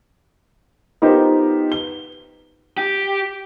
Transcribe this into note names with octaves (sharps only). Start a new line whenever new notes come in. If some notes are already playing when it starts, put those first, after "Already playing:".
B3 D#4 F4 G4 A#4 C5
G7
G4